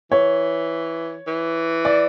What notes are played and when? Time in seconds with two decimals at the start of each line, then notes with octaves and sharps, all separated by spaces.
0.12 E3 C#5
1.27 E3
1.85 D5